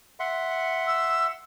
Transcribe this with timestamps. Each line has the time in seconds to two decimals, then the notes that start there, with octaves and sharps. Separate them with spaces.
0.20 E5 F#5 C6
0.87 E6